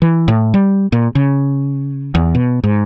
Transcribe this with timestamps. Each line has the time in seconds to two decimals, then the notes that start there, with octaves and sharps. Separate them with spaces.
0.02 E3
0.28 A2
0.54 G3
0.92 A#2
1.15 C#3
2.15 E2
2.35 B2
2.64 G#2